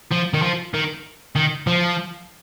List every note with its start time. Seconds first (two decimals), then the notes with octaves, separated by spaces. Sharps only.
0.12 F3
0.34 D#3
0.42 F3
0.74 D#3
1.36 D#3
1.67 F3